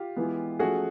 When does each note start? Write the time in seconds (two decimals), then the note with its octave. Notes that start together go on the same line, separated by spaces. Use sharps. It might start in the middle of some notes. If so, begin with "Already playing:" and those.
Already playing: F4 G4
0.16 E3 G#3 B3
0.59 F3 A3 C#4 F#4 G#4